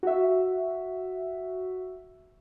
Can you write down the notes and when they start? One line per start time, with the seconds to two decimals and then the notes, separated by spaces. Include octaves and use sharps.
0.03 F#4 E5